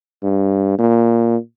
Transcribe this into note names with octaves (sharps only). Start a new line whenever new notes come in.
G2
A#2